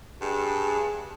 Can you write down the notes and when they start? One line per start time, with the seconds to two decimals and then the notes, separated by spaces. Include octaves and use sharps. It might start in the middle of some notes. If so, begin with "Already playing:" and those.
0.22 G2 G#4